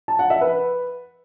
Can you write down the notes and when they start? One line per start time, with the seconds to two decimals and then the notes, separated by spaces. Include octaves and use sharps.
0.08 A5
0.19 F#5
0.30 E5
0.41 B4